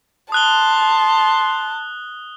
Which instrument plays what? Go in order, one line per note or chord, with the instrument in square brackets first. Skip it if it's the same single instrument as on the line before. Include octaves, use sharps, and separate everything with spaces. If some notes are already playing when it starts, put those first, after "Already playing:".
[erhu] A5 [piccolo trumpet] C6 [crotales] D#6 F#6 G7